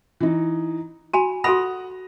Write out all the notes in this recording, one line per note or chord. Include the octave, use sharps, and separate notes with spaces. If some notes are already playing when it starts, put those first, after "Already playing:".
E3 D#4
F#4 G#5 B5 D#7
F#4 A4 F#5 B5 D#6 A#6